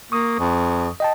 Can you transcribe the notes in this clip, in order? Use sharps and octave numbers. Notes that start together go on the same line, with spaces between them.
A#3 C#6 D#6
F2
D#5 G5 A5